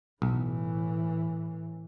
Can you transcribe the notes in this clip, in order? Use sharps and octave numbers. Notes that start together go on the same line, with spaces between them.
B1 A2 E3